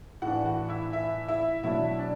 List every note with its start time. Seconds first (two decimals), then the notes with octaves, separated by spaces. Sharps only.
0.22 A2 E3 D4 F#4 F#5
0.45 F#4 F#5
0.69 E4 E5
0.92 E4 E5
1.28 E4 E5
1.63 B2 F#3 A3 D4 E4 E5
1.99 D4 D5